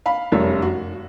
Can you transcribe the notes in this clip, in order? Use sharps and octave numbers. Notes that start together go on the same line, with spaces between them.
F5 B5
F1 F#2 G3 C#5
F#4